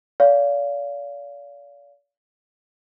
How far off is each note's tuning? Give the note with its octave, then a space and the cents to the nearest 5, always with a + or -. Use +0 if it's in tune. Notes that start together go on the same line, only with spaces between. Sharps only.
D5 -45 F5 +0